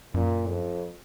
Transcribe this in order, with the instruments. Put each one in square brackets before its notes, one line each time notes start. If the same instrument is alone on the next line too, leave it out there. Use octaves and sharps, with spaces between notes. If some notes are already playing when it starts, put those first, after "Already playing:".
[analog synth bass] F#2 [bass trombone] A#2
[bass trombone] F2